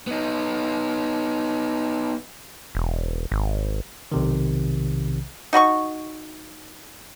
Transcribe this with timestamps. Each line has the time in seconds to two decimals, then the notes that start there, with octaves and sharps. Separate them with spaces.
0.07 B3 D#4
2.75 E1
3.32 G#1
4.12 B1 C3 D#3
5.53 D#4 F#4 B5 C#6